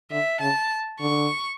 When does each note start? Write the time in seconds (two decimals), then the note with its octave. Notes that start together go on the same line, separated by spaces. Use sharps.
0.11 D3 E5
0.40 C#3 A5
1.00 D3 C#6